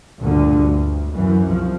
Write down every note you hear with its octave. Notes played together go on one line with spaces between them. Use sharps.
D2 G2 A#2 D3
D2
F#2 E3
C2 F3